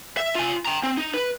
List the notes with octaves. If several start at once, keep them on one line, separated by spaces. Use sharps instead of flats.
E5
F4 G#5
G5 A#5
C4
D#4
B4